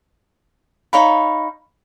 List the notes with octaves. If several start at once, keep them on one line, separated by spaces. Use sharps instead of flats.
D#4 C#5 F5 B5